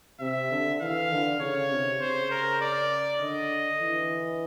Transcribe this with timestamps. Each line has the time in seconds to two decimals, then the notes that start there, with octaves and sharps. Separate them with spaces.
0.20 C3 E5
0.51 D3
0.81 E3 F5
1.11 D3
1.40 C#3 C#5
1.70 C3
2.00 C#3 C5
2.31 A#4
2.61 D5
3.20 D3 D#5
3.81 E3